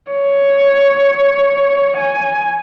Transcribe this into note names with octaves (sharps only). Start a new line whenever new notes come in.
C#5
G#5